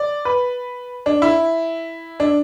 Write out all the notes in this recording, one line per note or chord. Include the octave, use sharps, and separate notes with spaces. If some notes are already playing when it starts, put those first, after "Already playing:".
Already playing: D5
B4
D4
E4
D4